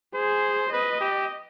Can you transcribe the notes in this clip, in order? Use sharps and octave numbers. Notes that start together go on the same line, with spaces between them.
G#4 C5
B4 D#5
G4